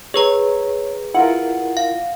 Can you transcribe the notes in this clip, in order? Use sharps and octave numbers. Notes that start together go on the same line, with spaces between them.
G#4 B4 C#5 A#5
E4 F4 A#4 F#5
F5